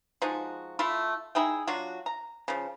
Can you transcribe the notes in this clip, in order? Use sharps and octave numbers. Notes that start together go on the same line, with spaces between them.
F3 G#3 D#4 F#4
A3 E4 F4
D#4 E4 G#4 G5
F#3 D4 F4 F#4
A#5
C#3 F3